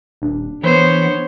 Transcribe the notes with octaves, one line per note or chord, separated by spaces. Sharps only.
D#1 D4
E3 B3 C5 C#5